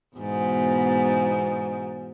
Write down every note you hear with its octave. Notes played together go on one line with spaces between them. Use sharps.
E2 G#2 B2